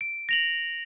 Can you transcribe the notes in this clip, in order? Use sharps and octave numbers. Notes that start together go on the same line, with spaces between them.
D7
A#6 F7 F#7